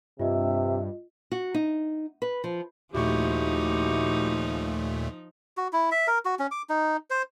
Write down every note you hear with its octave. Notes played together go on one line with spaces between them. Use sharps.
G2 C3 F4 D#5 E5
F#4
D#4
B4
F3
D#2 A#2 F3 A3 D#4 E4 F#4 G4
F#4
E4
E5
A#4
F#4
C#4
D6
D#4
C5